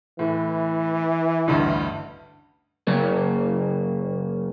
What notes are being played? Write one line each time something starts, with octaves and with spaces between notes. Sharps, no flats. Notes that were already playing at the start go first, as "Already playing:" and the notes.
A2 E3
A1 D2 G2
F#2 C#3 A#3